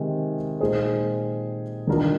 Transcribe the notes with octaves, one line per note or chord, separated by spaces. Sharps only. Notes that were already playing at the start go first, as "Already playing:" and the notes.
Already playing: C3 D#3 G#3
A#2 G#3 D#4 G#4 C5
D#3 A#3 D4 F4 A#4